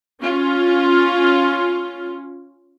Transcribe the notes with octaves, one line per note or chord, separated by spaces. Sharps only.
C#4 F4